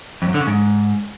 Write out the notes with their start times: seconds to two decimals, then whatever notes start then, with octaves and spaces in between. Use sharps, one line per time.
0.22 F2
0.28 F#2
0.34 D3
0.41 C#3
0.47 G#2